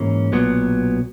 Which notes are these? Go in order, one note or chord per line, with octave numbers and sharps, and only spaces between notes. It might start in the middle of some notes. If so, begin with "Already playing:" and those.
Already playing: G#2 E3 A#3 C#4
B1 A#2 F#3 B3